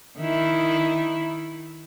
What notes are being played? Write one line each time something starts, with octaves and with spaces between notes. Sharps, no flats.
D#3 E4